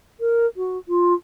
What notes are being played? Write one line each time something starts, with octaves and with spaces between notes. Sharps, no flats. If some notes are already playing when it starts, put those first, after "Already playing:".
A#4
F#4
F4